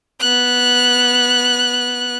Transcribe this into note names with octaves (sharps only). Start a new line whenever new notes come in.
B3 F#6